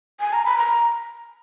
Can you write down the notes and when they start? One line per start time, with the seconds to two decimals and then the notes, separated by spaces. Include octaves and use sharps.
0.20 G#5
0.33 A#5
0.45 B5
0.58 A#5